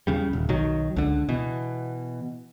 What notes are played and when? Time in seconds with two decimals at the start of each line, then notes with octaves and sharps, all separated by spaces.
0.07 E2 C#3 G3
0.33 D#1
0.49 B1 D#3 F#3
0.96 C#2 D3
1.29 B2 E3